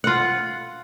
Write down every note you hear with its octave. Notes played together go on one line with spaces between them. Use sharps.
F4 F#5